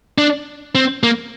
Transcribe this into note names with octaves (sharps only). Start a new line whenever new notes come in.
D4
C4
A#3